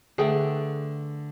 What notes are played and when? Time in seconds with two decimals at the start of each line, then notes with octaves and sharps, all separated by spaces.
0.18 D3 A3 G#4 B4 F#5 G5